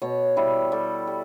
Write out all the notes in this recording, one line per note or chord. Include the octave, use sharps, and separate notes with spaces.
B2 C#5
G3 E4
G3 A4
G3